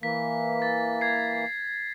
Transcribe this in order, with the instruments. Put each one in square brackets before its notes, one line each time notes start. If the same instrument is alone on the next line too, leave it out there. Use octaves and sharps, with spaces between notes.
[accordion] E3 A#3 [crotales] B6
[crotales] A6
G#6 C7